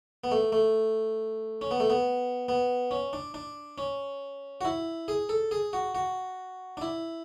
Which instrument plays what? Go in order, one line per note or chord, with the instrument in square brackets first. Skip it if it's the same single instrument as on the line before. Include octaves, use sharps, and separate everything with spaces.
[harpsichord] B3
A3
A3
C#4
B3
A3
B3
B3
C#4
D4
D4
C#4
F#4
E4
G#4
A4
G#4
F#4
F#4
D4
E4